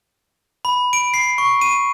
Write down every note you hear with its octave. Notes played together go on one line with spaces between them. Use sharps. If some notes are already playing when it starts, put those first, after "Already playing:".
B5
D7
C7
C#6
D#7